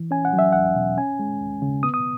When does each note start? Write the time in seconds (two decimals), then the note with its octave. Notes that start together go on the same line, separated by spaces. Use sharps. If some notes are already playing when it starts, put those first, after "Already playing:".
Already playing: E3
0.11 C#4 G#5
0.25 F#5
0.33 F#3
0.39 E5
0.52 E2 F#5
0.75 B2
0.97 C#4 G#5
1.19 G#3
1.41 D#2
1.62 C#3
1.83 B3 D#6
1.94 D#6